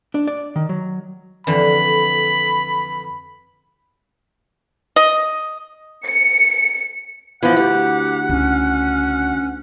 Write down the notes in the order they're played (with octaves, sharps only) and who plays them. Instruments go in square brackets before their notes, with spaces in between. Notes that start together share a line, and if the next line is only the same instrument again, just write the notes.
[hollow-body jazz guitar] D4
D5
D#3
F#3
[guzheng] F2 D3 E3 [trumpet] B5
[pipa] D#5
[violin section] C#7
[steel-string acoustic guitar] E3 F3 [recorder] B3 [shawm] F#5
[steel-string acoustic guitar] D2 [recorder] G4
[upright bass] C#2 [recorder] C#4